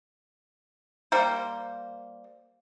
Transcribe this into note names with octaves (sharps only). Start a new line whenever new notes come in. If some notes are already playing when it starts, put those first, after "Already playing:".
G3 A#3 C5